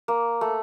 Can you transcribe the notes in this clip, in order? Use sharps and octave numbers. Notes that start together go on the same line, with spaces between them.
A#3
A3